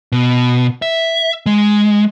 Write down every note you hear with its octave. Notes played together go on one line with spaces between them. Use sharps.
B2
E5
G#3